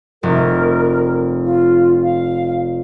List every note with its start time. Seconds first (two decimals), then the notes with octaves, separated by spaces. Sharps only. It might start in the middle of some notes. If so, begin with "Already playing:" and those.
0.23 F1 A#4
1.44 F4
2.03 F5